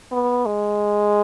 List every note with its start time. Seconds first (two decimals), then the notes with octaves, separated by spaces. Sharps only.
0.12 B3
0.46 G#3